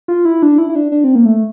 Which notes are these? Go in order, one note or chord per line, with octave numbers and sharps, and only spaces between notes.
F4
E4
D4
E4
E4
D4
D4
C4
A#3
A3